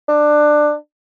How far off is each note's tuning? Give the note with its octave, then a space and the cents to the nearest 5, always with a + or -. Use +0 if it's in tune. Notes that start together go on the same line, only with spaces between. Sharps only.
D4 +15